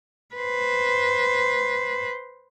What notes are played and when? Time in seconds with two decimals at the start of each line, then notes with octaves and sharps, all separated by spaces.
0.35 B4 C5